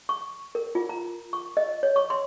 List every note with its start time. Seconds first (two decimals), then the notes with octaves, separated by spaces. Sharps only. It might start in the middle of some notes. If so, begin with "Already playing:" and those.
0.09 C#6
0.55 A#4
0.75 F4
0.89 A#5
1.33 C#6
1.57 D#5
1.83 C#5
1.96 C#6
2.10 C6